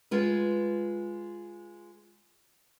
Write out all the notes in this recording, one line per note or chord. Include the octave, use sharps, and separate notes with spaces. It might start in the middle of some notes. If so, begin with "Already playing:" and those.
G#3 F4 B4